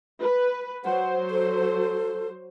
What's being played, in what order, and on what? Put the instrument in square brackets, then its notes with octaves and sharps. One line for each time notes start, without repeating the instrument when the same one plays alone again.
[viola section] B4
[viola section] F#3 C5 [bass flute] F#5
[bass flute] A4